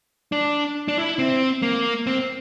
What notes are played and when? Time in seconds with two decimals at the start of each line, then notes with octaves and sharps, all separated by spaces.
0.32 D4
0.88 D4
0.98 E4
1.19 C4
1.62 A#3
2.07 C4